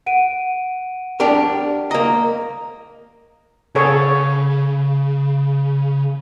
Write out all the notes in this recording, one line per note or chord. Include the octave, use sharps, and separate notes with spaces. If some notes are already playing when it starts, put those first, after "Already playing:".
F#5 D7 D#7
D4 G4 A#4
A#3 D#5 A#5
C#3 G#4 A4 C#5